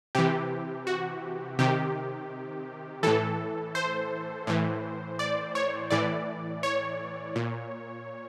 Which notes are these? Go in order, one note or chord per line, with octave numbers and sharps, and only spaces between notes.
C3 E3 G4
F#4
C3 D#3 G4
A2 E3 A4
C5
A2 E3
D5
C#5
A2 E3 D5
C#5
A#2